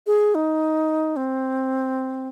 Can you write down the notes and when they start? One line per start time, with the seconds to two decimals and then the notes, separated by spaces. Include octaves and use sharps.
0.07 G#4
0.35 D#4
1.16 C4